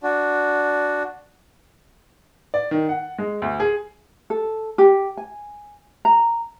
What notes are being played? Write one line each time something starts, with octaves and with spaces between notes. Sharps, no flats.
D4 F#4
D5
D#3
F#5
G#3
D2
G#4
A4
G4
G#5
A#5